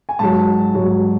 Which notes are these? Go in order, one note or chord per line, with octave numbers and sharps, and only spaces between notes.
G#5
G#2 F#3 A5
G#2 F#3